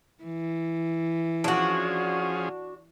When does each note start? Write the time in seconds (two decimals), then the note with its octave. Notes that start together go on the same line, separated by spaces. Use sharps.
0.24 E3
1.44 F3 C#4 D4 F#4 G#4